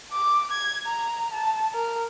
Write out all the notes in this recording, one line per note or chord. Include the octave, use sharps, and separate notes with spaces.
D6
G#6
A#5
A5
A#4